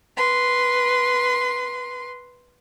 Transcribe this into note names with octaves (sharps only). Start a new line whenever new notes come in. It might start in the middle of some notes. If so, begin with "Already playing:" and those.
B4 C6